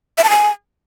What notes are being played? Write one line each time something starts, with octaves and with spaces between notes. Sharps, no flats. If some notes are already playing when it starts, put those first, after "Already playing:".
E5
A5
G#5